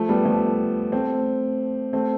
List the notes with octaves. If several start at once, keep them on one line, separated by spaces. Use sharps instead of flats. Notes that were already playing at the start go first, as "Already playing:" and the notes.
Already playing: F3 A3
G3 B3
F3 A3
A3 C4
A3 C4